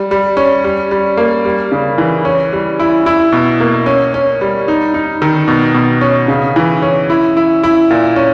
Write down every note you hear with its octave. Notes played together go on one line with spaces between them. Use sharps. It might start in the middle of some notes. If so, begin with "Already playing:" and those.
Already playing: G3
G3
C#4
G3
G3
A#3
G3
C#3
E3
C#4
G3
E4
E4
B2
A#3
C#4
C#4
G3
D#4
D#4
D#3
B2
B2
C#4
C#3
E3
C#4
E4
E4
E4
A#2
C#4